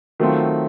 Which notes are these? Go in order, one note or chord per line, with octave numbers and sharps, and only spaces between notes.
D#3 F#3 A3 C4 F4